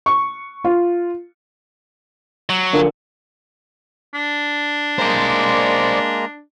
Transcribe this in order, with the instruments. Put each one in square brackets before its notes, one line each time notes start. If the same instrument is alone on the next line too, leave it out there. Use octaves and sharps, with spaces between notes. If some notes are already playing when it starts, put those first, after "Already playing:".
[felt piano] C#6
F4
[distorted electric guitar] F#3
[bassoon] A#2 [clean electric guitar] D3
[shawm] D4
[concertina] G#3 A#3 A#5 [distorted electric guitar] C5 D5